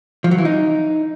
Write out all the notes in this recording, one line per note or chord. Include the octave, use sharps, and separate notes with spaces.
F3
F#3
E3
D#4